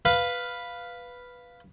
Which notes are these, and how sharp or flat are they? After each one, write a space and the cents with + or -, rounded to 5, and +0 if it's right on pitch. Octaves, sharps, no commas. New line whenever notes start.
B4 +0 F5 +0